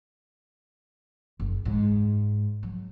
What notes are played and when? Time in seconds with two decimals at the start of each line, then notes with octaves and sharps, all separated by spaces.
1.40 F#1
1.65 G#2
2.63 F#3